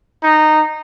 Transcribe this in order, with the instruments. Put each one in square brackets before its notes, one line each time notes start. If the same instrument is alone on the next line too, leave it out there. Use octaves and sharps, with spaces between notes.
[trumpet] D#4